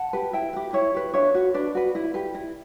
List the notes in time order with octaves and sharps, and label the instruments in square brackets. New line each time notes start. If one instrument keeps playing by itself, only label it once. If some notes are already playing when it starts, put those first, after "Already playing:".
Already playing: [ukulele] F#5 A5
G4 B4
E4 E5 G5
G4 B4
E4 C#5 E5
G4 B4
D4 C#5 E5
F#4 B4
D4 B4 D5
F#4 B4
E4
G4 B4
E4